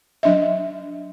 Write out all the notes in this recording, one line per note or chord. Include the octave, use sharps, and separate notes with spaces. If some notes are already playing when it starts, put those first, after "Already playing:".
F#3 D4 D#5 E5